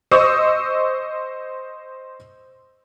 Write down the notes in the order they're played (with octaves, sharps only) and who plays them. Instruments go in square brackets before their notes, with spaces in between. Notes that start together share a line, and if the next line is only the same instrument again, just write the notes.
[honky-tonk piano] C5 D#5 C#6 D#6 E6